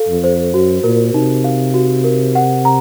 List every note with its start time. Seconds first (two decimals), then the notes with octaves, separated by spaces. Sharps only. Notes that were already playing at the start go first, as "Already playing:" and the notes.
Already playing: A4 F5
0.08 F2
0.24 C5
0.53 F#2 F#4
0.83 A#2 A#4
1.14 C3 D#4
1.44 F5
1.74 F#4
2.04 A#4
2.35 F#5
2.65 A#5